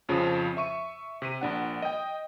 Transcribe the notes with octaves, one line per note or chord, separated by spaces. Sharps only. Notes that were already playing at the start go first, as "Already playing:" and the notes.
F2 C#3 F3
E5 C#6 D#7
C3 B6 D#7
A#1 D4 F#5
D#5 G5